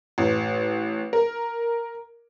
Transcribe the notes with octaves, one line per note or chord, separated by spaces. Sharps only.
A1
A#4